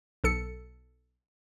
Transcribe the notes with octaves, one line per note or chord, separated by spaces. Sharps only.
B1 A4 C#7